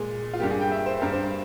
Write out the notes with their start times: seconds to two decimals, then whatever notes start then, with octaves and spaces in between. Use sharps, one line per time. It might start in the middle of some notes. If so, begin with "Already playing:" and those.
Already playing: A#2 G#3 G#4
0.34 F4
0.40 G2 G3 A#3 G4
0.50 G#4
0.61 G5
0.71 E5
0.86 C5
1.01 G2 G3 A#3 A#4
1.12 C5